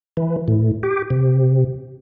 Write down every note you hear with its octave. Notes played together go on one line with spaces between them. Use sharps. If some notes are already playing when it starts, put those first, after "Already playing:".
E3
A2
G4
C3